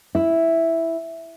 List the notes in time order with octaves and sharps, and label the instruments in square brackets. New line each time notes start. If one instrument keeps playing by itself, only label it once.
[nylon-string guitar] E4